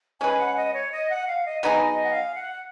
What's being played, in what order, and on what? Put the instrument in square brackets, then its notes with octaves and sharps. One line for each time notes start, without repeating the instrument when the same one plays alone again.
[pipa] G#3 C#4 G#4 B4 [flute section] G#5
[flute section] F#5
D#5
C#5
D#5
F#5
F5
D#5
[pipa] F#3 B3 D#4 G#4 [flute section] D#5
[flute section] D#5
F#5
F5
F#5